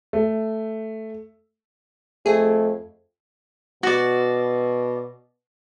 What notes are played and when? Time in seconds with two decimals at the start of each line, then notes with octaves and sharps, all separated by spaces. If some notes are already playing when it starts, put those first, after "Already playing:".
0.13 A3
2.26 F2 A3 G#4
3.83 B2 F#4 D5